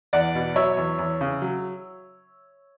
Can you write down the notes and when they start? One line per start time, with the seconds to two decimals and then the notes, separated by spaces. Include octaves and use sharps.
0.13 E2 D5 F#5
0.35 B2
0.56 F#3 C#5 E5
0.77 E2
0.99 E2
1.21 C#3
1.42 F#3